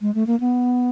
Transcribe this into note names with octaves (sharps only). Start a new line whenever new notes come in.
G#3
A3
A#3
B3